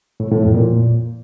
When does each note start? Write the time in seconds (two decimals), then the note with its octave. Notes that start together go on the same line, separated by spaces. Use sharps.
0.20 A2
0.31 A2
0.43 F2
0.54 A#2